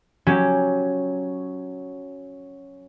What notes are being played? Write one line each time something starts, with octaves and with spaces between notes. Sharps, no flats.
F#3 C#4 G4